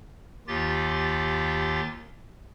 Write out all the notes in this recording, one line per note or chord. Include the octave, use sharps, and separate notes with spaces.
D#2 D#3 F4 G4 A6